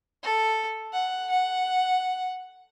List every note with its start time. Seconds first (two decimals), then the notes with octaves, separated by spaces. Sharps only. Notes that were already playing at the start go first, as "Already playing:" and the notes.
0.23 A4
0.93 F#5
1.30 F#5